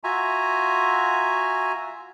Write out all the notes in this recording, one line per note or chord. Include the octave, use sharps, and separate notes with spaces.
F4 F#4 E5 G#5 A#5